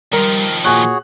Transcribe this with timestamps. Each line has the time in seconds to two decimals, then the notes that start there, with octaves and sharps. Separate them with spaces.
0.13 D#3 F3 G3 A#4
0.65 A#2 F#4 G#4 C#5 G#5 F#6